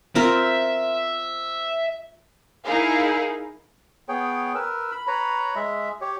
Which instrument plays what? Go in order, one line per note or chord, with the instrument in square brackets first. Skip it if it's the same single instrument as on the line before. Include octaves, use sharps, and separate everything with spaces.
[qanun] C4 F4 A#4 [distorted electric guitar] E5
[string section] D#4 E4 G#4 A#4 F5
[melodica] B3 G#4 C#5 G5
A#4 B4 E6
B5
B4 C#5 A#5 B5
G#3 E5
G4 C#5